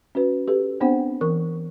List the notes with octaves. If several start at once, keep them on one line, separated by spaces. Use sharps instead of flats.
C#4 F#4 B4
G4 A4 B4
B3 C4 D4 C5 F#5 G5
E3 A#4 C#6